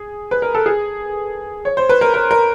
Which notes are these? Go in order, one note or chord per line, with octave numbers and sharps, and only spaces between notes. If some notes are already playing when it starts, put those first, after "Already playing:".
Already playing: G#4
B4
A#4
A4
G#4
C#5
C5
B4
A#4
A#4
A#4